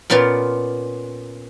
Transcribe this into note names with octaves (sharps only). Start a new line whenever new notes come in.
A#2 B3 C#4 F4 D5